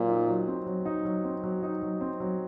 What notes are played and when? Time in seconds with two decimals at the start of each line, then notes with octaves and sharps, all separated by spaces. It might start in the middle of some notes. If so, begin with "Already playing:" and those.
Already playing: A#2 F#3 C4
0.10 D#4
0.28 F#3
0.48 C4
0.67 F#3
0.85 D#4
1.05 F#3
1.24 C4
1.44 F#3
1.63 D#4
1.82 F#3
2.01 C4
2.20 F#3